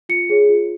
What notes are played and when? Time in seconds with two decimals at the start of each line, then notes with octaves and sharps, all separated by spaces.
0.09 F4 C#7
0.30 G#4 C#5
0.49 F4